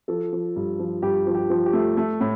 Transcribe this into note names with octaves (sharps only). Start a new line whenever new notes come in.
F3 A4
F3
G2
F3
G2 G4
F3
G4
F3
G4
A3
A3
A2